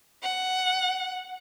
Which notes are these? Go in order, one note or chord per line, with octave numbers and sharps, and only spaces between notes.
F#5